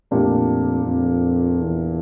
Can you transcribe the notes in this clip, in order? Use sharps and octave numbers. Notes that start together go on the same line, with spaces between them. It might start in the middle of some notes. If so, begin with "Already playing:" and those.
F2 A#2 A3 D4 G4
F2
E2